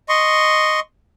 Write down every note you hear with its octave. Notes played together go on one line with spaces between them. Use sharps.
D#5 C6 C#6